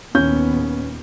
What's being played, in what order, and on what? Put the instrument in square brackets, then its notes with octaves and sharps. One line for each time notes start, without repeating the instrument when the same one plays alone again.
[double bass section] D#2 A#2 B3 [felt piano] C#4 G6